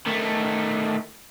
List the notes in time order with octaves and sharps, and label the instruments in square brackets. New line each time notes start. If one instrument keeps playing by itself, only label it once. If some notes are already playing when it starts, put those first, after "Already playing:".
[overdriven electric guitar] D#3 A3